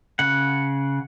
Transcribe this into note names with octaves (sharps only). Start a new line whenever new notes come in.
C#3 F#5